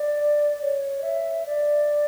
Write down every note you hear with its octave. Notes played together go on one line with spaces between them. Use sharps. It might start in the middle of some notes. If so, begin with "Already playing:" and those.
Already playing: D5
D5
C#5
E5
D5